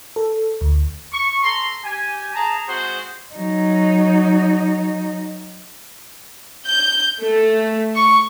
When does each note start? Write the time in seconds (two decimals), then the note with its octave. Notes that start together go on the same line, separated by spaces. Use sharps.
0.16 A4
0.61 D2
1.12 C#6
1.43 A4 A#5 C6
1.84 G4 G#5
2.34 G#4 A5 A#5
2.68 G#3 C4 F#4 G#4 C5
3.35 F#3 D#4
6.67 G6
7.21 A3
7.95 C#6